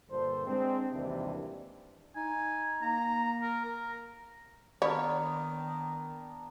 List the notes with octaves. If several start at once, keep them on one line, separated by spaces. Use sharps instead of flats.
G2 A#2 D3 A4 C5
G#3 C4 D4
G#1 D#2 C3 E3 G3 D4
D#4 G#5
A#3 A#5
A#4
A#4
D#3 B3 D4 A#4 C#5 D5 F5 B5